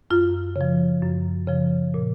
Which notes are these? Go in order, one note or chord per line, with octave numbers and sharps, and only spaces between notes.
F#2 F4
C#3
F3
F#2
C#3 F3
A#2